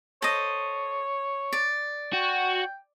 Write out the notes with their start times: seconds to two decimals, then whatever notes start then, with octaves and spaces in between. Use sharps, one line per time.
0.22 A4 C5 C#5 D#5
1.53 D5
2.13 F#4 G5